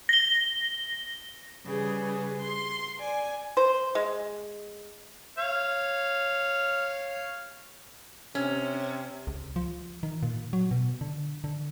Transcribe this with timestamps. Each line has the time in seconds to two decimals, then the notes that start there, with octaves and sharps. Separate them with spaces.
0.09 A#6 G7
1.66 C#3 G3 G#4 B4
2.41 C6
2.99 D5 G#5
3.57 C5
3.95 G#3
5.38 C#5 F5
8.35 C3 C#4
9.27 C#2
9.56 F3
10.03 D#3
10.23 A#2
10.53 F#3
10.71 B2
11.01 D3
11.44 D3